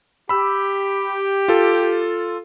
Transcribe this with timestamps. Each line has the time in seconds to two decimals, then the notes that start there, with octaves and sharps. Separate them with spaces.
0.29 G4 B5 E6
1.48 F4 A4